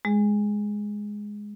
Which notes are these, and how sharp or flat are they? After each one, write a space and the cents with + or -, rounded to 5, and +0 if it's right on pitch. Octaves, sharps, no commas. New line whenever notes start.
G#3 +0 G#4 +0